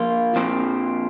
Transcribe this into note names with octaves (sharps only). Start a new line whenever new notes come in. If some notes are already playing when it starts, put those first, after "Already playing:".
Already playing: F3 A#3 F4
A#2 F3 C4